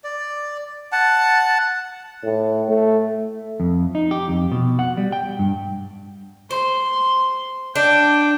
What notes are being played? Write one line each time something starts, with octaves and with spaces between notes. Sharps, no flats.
D5
F#5 A5
A2
A3
F2
D#4
G4
F2
B2
F#5
G3
G5
G2
C5 C6
D4 G5